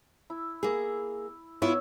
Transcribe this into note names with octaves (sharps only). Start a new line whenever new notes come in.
E4
A#3 G#4
B3 E4 F4 C#5 E6